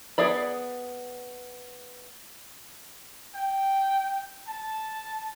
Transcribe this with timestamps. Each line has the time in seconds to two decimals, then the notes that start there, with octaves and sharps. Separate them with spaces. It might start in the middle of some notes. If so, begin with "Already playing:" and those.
0.18 B3 G#4 D5 B5
3.35 G5
4.48 A5